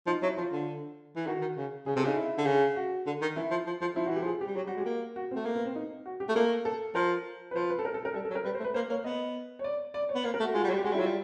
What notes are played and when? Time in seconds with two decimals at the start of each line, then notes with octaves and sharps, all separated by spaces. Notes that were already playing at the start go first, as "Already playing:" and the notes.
0.07 F3 D#4
0.22 F#3 E4
0.37 F3 F4
0.52 D3
1.16 E3
1.27 D#3 F#4
1.41 D#3
1.57 C#3
1.86 C#3 G#4
1.96 C3 A4
2.04 C#3 D#4
2.16 E4
2.38 D3
2.46 C#3
2.76 F#4
3.06 D3
3.21 D#3
3.36 E3 E4
3.51 F3
3.66 F3
3.81 F3
3.95 F3 E4
4.06 E3 F#4
4.16 G4
4.22 F3 G#4
4.41 G4
4.47 G3
4.56 F#3 G4
4.66 G3 F#4
4.76 G#3
4.80 G4
4.85 A#3
5.16 F#4
5.31 C4
5.36 A3
5.45 A#3
5.55 B3
5.65 C4
5.75 D#4
6.06 F#4
6.20 G4
6.29 A3
6.35 A#3 A4
6.65 A4
6.95 F3 A#4
7.51 B4
7.55 F3 C5
7.69 B4
7.79 A4
7.85 A#4
7.94 A4
8.05 A#4
8.14 G3 A4
8.25 A4
8.30 F#3
8.35 A#4
8.45 G3 B4
8.55 C5
8.59 A3
8.64 B4
8.74 A#3 C5
8.89 A#3 C#5
9.04 B3 D#5
9.59 C#5
9.64 D5
9.94 D5
10.09 C#5
10.15 B3
10.24 A#3 C5
10.34 A#4
10.39 A3
10.44 F#4
10.54 G#3 F4
10.62 G3 F#4
10.69 F#3
10.73 G3
10.78 G4
10.84 G#3 F#4
10.92 G3 E4
10.99 F#3 F4
11.06 G3